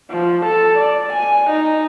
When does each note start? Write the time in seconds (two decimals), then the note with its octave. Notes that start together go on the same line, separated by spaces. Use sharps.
0.11 F3
0.45 A4
0.78 D5
1.13 G#5
1.50 D#4